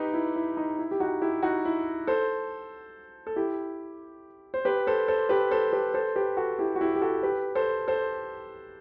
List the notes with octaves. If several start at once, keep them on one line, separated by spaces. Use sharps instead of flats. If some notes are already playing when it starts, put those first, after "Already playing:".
Already playing: D#4 G4 B4
E4
E4
D#4
E4
G4
D#4 F#4
E4 G4
D#4 F#4
E4
A4 C5
A4
E4 G4
C5
G4 B4
A4 C5
A4 C5
G4 B4
A4 C5
G4 B4
A4 C5
G4 B4
F#4 A4
E4 G4
F#4
E4 G4
G4
F#4 A4
G4 B4
A4 C5
A4 C5